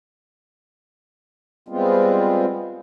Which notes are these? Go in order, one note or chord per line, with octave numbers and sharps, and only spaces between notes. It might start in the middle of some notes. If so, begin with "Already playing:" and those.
G3 G#3 B3 C4 F4